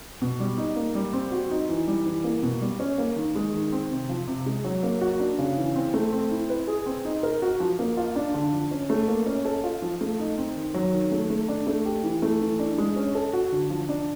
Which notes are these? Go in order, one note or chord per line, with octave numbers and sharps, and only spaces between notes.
B2
G3
D#4
A#3
G3
C4
F#4
D#4
E3
G3
E3
A#3
B2
G3
C#4
A#3
D#3
G#3
D#3
C4
C3
F3
C3
G#3
F#3
A#3
F#4
D4
C#3
E3
C4
A3
C4
E4
B4
G#4
C4
D#4
A#4
F#4
F3
A#3
F4
D4
D3
F3
C#4
A3
A#3
C#4
A4
F4
F3
A3
D#4
C4
D#3
F#3
D#3
A3
A3
D4
A3
G4
E3
A3
E3
D4
G#3
C#4
A4
F#4
D3
F3
D4